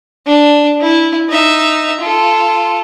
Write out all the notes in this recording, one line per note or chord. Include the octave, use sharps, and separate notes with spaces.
D4
E4
D#4 E5
F4 A4